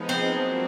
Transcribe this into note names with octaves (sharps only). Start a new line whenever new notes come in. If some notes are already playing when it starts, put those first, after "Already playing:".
Already playing: F3 G#3 B3 D#4
C4
F#3 A#3 D4 F#4